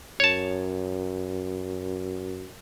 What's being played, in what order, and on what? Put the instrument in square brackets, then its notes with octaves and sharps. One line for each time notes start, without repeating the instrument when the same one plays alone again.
[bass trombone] F#2 [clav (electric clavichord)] C#5 A5